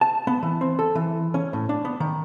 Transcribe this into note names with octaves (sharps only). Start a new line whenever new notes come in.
A5
B3
E3
C4
A4
E3
C#4
A2
D4
B3
D#3